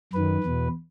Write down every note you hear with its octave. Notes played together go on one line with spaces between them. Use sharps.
F#2 D#3 B4
E2 B2